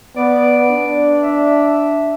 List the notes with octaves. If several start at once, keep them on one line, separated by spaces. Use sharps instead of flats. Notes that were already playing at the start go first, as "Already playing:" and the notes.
B3 D5
D4
E5